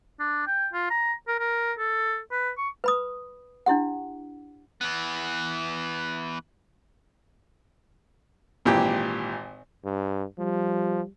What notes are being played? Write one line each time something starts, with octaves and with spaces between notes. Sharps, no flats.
D4
G5
F4
A#5
A#4
A#4
A4
B4
C#6
B4 B5 D#6
D4 E4 G4 F#5
E3 B3
G#1 A#2 E3 G4 G5
G2
F3 G3